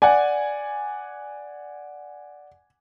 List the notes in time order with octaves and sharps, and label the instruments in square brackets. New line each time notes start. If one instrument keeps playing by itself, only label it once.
[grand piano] D5 F#5 [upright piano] G#5